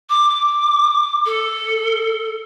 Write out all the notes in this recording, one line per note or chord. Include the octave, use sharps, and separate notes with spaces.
D6
A4